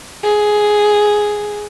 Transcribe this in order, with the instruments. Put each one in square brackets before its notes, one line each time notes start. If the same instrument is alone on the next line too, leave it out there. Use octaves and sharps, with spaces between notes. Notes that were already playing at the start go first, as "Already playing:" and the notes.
[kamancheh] G#4